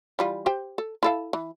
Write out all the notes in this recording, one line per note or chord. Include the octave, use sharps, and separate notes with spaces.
E3 G3 F4
G4 C5 G5
A4
E4 A4 F5
E3